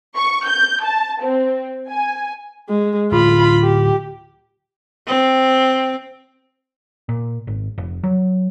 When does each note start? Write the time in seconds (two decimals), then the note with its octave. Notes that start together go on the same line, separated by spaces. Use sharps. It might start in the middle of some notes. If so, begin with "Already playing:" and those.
0.16 C#6
0.46 G6
0.84 A5
1.22 C4
1.89 G#5
2.69 G#3
3.12 D1 F4 B5
3.62 G4
5.07 C4
7.09 A#2
7.47 G#1
7.78 F1
8.04 F#3